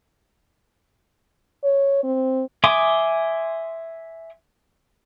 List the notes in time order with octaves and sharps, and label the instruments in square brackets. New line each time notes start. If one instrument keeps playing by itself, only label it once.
[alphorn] C#5
C4
[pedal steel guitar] E5 G#5 C6 D6 D#6